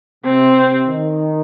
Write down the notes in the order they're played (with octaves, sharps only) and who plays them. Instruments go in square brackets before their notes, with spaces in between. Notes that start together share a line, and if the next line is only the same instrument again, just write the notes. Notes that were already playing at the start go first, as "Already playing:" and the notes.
[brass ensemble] C3 [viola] C4
[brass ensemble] C3
D#3